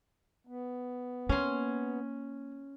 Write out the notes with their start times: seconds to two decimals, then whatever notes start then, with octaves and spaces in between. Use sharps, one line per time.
0.47 B3
1.29 A#3 C#4 C6